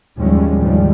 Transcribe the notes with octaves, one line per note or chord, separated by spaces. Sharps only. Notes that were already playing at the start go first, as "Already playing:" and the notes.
D#2 F3 G3 G#3 C#4
D#2 G#2 D3 F3 G3 G#3